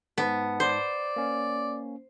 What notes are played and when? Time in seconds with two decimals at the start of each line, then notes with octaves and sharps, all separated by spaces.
0.18 G#2 B3 A5
0.60 C5 D5
1.16 A#3 C#4